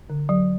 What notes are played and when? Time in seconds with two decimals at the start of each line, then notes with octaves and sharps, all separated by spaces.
0.10 D3
0.29 F#3